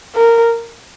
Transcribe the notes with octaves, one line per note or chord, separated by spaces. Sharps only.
A#4